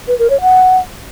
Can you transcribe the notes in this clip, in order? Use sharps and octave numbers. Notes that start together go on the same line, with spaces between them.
B4
A#4
C#5
F#5